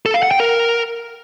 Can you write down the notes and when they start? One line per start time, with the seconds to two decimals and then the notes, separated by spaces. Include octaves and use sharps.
0.06 A4
0.14 F5
0.23 F#5
0.31 G5
0.40 A#4